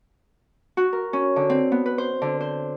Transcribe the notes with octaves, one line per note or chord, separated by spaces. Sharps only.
F#4
A#4
C#4
D3
C4
B3
B4
C5
D3
C5